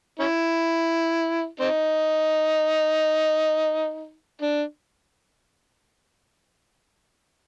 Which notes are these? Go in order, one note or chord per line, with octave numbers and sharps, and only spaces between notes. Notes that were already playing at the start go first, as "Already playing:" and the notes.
C#4 E4
C4 D#4
D4